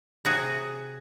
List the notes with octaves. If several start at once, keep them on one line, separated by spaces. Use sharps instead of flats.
C3 F#4 G#4